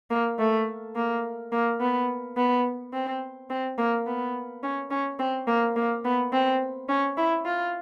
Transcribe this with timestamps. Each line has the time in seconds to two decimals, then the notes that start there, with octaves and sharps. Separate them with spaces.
0.10 A#3
0.39 A3
0.96 A#3
1.52 A#3
1.81 B3
2.37 B3
2.93 C4
3.50 C4
3.78 A#3
4.07 B3
4.63 C#4
4.91 C#4
5.19 C4
5.47 A#3
5.76 A#3
6.05 B3
6.33 C4
6.89 C#4
7.17 E4
7.45 F4